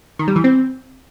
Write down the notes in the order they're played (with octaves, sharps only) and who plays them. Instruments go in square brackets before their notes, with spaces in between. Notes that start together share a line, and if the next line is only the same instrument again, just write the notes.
[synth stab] D#3
G3
E3
C4